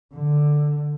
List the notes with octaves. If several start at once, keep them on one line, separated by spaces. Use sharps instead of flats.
D3